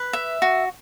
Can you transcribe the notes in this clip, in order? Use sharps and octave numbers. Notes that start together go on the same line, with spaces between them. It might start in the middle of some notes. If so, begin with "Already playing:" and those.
Already playing: B4
E5
F#4